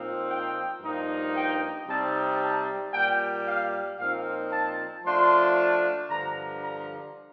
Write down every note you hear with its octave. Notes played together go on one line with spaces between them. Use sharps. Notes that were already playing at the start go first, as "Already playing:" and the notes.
Already playing: A#2 F3 C4 D#4
G5
G2 F3 A#3 D#4
G5
C3 G3 C4 D#4 A5
A5
A#2 G3 A#3 G5
F5
A#2 F3 C4 D#4 F5
A5
F3 A3 D4 F4 C6
G2 D3 F3 A#5
A#5